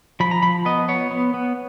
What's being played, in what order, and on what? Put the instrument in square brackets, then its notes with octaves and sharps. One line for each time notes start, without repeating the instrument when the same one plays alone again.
[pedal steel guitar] F3 B5
A#5
F3 B5
B3 D#5
B3 C#5
B3
B3